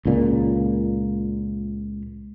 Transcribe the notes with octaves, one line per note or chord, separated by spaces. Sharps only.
C#2 A#2